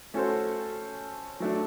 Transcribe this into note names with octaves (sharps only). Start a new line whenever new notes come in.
A3 C#4 F#4 A4 C5
F#3 A3 D4